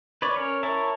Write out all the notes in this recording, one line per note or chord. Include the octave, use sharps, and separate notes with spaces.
B4 C#5 D5
C#4 A#4 C#5
E4 A#4 C#5 E5 A5